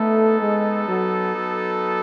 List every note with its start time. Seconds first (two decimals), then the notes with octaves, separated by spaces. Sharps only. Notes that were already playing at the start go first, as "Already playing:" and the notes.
Already playing: A3 B3 D#4 A4
0.40 G#3
0.88 F#3
1.35 F#3